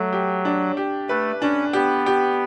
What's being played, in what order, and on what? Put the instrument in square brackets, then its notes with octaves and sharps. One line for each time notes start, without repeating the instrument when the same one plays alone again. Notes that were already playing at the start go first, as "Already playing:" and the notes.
Already playing: [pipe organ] F#3 [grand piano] A3
[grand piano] G4
D4
G4
[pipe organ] A3 [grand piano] B4
[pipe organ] C#4 [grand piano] D4
[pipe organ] B3 [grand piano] G4
[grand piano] G4